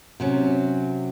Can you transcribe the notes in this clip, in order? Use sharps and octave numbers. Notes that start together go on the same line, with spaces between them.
C3 F#3 C#4